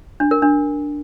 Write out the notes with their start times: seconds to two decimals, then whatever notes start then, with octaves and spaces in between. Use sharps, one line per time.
0.20 D4
0.31 A#4
0.42 D4